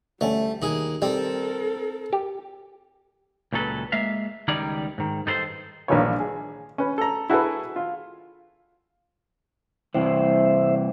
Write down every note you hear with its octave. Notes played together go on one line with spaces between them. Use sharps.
D2 G3 A3 C#4
D#2 G#4
G3 C4 A4 A#4
G4
C#2 A#2 F#3 A4 B4
G#3 A#3 E5 F5
C#2 D#3 G3 D#4 C#5 D5
G#2 D#3
G2 D#4 A4 A#4 C5
A#1 G2 D#3 E3 F4 C#5
G#4
C#4 B4
A4 A#5
E4 F#4 G#4 A4 B4
F4
G2 C3 E3 C5 E5